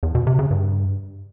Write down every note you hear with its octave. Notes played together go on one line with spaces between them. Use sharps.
E2
B2
C3
C#3
G2